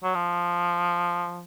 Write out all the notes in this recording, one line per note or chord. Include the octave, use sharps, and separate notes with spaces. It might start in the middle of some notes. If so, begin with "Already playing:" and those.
F#3
F3